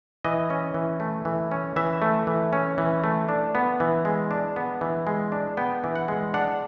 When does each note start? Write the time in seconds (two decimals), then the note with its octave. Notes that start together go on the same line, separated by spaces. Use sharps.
0.24 E3 D#5
0.50 C#4
0.74 E3
1.00 A3
1.25 E3
1.51 C#4
1.76 E3 E5
2.02 A3
2.27 E3
2.53 C#4
2.78 E3
3.04 A3
3.29 D4
3.55 B3
3.80 E3
4.05 G#3
4.31 D4
4.56 B3
4.81 E3
5.07 G#3
5.32 D4
5.57 B3 G5
5.84 E3
5.95 F#5
6.08 G#3
6.34 D4 F#5